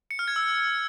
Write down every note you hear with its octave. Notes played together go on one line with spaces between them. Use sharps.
C#7
F6
G#6
E6